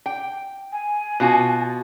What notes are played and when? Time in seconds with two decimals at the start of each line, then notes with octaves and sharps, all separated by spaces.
0.06 G5
0.72 G#5
1.20 B2 F4 F#4